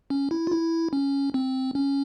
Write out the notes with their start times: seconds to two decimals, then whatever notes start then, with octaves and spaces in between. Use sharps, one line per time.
0.10 C#4
0.31 E4
0.47 F4
0.51 E4
0.93 C#4
1.34 C4
1.75 C#4